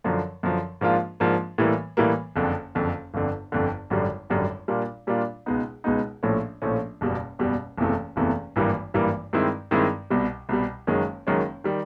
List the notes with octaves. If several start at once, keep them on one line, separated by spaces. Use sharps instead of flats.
F#2 D3 F3
F#2 D3 F3
G#2 F3 A#3 D4 F4
G#2 F3 A#3 D4 F4
A2 E3 G3 A#3
A2 E3 G3 A#3
F#1 F2 D3
F#1 F2 D3
G1 F2 D3
G1 F2 D3
G#1 F#2 D3 G3
G#1 F#2 D3 G3
A#2 G3 A#3 D4 F4
A#2 G3 A#3 D4 F4
C#2 B2 G#3 B3 D#4
C#2 B2 G#3 B3 D#4
A#1 A2 F3 A3 C#4
A#1 A2 F3 A3 C#4
F#1 E2 B2 G3
F#1 E2 B2 G3
F#1 E2 C3 E3 A3
F#1 E2 C3 E3 A3
G#1 G2 E3 G3 A#3
G#1 G2 E3 G3 A#3
G2 D#3 G#3 C4 E4
G2 D#3 G#3 C4 E4
C2 B2 G3
C2 B2 G3
F#1 F#2 D#3 G#3 C#4
F#1 F#2 D#3 G#3 C#4
D#3 G3